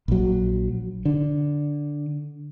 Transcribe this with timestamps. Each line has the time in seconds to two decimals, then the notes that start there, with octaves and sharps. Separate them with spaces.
0.08 A#1 F#3
1.05 D3